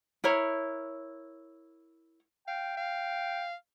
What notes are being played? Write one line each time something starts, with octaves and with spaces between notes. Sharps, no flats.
E4 A#4 C#5
F5 G5
F5